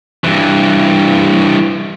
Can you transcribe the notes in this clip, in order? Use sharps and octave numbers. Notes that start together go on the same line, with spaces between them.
G2 E3